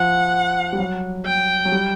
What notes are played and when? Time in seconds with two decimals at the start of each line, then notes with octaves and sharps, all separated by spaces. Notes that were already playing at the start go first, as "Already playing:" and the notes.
Already playing: F3 F#5
0.73 G3
0.78 F#3
1.25 G5
1.65 F#3
1.72 G3